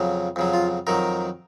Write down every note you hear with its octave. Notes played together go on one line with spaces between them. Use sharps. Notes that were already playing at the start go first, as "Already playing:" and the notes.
Already playing: F2 C#3 F#3
F2 C#3 F#3
F4
F2 D#3 F#3 A#4